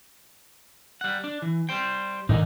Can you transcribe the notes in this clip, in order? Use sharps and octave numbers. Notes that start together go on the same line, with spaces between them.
G3 F#5
D4
E3
G3 C5 G5
G#2 D3 D#3 D#4